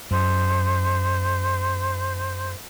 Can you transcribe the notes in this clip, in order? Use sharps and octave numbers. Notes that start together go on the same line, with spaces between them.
F#2 C5